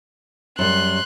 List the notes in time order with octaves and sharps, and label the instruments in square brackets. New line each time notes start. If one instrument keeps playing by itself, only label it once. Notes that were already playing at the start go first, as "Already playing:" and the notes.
[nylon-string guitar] F#2 G3 [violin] C6 F#6